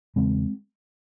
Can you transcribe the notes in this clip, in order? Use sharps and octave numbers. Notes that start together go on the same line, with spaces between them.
E2 C#3 G#3 C4